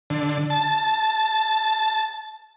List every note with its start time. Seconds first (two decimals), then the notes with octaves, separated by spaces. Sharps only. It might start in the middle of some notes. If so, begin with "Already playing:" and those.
0.10 D3
0.50 A5